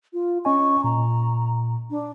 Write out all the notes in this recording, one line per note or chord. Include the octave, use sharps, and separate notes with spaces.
F4
C#4 D#5 G#5 C#6
A#2 A#5
D4